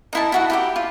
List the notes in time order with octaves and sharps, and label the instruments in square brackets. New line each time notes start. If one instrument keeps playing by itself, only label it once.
[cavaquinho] D#4 E4 A5
E4 F#4 F#5
E4 G4 D6
F4